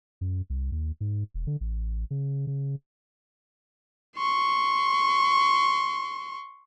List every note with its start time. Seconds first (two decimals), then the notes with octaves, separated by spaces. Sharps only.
0.21 F#2
0.50 C2
0.72 D#2
1.01 G#2
1.34 E1
1.47 D3
1.61 A1
2.11 C#3
2.47 C#3
4.17 C6 C#6